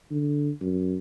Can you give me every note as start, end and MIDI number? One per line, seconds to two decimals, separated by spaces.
0.11 0.51 50
0.61 0.97 42